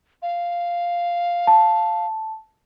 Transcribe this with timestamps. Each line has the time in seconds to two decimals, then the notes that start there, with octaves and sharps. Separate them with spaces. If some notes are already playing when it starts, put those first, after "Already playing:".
0.22 F5
1.47 A5